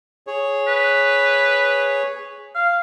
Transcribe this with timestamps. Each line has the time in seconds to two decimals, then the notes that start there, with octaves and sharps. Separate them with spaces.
0.27 G#4 C#5
0.68 B4
2.55 F5